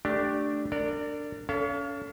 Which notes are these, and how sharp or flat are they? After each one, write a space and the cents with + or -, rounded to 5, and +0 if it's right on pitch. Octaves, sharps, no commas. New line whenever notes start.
A3 +0 D4 +0 G4 -10
D4 +0 A#4 -35 D5 +0
C#4 +35 A4 +0 F5 -25